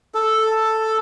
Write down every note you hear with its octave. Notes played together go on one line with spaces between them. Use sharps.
A4